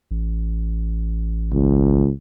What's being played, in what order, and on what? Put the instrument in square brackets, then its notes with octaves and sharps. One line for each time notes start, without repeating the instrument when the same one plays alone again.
[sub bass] A1
[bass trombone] C#2